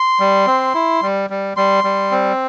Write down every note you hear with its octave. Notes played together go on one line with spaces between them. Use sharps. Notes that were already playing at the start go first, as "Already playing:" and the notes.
Already playing: C6
G3
C4
E4
G3
G3
G3 C6
G3
C4